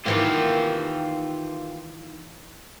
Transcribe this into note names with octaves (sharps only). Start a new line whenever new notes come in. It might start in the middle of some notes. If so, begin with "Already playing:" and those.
D#3 E3 A#3 F4 G4